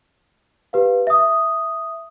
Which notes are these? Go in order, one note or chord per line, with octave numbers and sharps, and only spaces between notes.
G4 B4 F5
E5 D#6